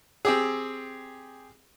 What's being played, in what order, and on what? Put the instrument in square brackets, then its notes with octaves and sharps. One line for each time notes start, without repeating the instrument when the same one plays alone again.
[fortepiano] C4 G4 G#4